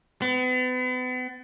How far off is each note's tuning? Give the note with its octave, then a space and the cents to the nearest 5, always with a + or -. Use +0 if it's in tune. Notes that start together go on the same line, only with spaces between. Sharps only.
B3 +40